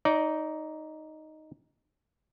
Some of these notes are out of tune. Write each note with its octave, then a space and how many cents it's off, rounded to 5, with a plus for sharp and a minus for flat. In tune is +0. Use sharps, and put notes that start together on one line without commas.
D#4 +0 D5 -30